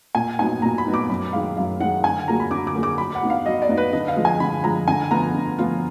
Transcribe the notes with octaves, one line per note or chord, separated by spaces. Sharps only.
A#2 G#5
F#3 B3 D#4 G#5
A#2 A#5
B5
F#3 B3 D#4
D6
F#2 B5
D#3 G#3 F5
F#2 F5
D#3 G#3 F#5
D3 G#5
F#3 A#3 F4 G#4 A#5
B5
D3 D6
D6
F#3 A#3 F4 G#4
D6
F#3 B5
F#5
B3 D#4
F5
F#3 D#5
D5
B3 D#4
B4
D3 D#5
F5
F3 G#3
G#5
D3 B5
F3 G#3 A#5
D3 G#5
F3 B3 F4 A#5
D3
F3 B3 F4